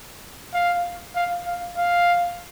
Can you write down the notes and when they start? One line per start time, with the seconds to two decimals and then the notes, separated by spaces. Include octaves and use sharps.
0.54 F5
1.16 F5
1.46 F5
1.77 F5